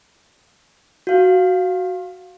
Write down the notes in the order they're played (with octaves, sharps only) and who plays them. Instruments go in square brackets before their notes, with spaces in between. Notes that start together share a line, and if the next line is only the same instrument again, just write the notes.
[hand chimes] F#4 F5